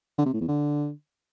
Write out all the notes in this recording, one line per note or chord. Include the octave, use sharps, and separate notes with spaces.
D3
C3
A2
E2
D3